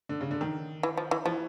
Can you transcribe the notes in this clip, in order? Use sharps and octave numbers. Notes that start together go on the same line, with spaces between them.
D3
C#3
D3
D#3
E3
F3
E3
E3 F3